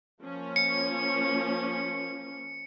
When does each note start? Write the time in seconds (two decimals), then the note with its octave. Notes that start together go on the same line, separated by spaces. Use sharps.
0.22 F3 A#3 C#4
0.56 C#7